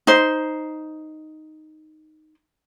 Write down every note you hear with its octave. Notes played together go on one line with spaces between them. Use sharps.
D#4 C5